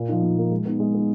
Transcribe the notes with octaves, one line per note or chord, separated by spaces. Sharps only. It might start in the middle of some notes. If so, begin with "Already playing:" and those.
Already playing: A#2
F3 A#3 D#4
A#2
F3 A#3 D#4
G#3
B3 D#4
G#3
B3 D#4